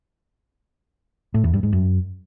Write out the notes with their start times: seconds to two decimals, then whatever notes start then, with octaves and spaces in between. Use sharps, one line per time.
1.34 A2
1.44 E2
1.53 G2
1.63 G#2
1.73 F#2